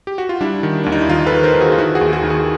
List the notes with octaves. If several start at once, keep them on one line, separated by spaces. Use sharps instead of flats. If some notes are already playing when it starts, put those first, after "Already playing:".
G4
F#4
F4
G3 D4 E4
D#3
D#2 D4
D#4
E4
D#3 D#4 F4
A4 B4
D#3
A#4 C5
D#3
F#4 G#4
F4
D#3 E4 F#4
F#4 G#4
D#2
F#4 G#4
D#3
F#4 G#4